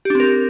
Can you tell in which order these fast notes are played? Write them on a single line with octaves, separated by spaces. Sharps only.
G4 D4 C4 A#4